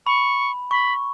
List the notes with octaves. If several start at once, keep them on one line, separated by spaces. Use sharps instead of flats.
B5 C#6
B5 C#6